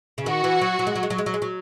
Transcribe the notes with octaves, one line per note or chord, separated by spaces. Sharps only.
C#3
D#3 F#4
E3
F#3
F#3
G#3
F#3
G#3
F#3
G#3
F#3
G#3
F#3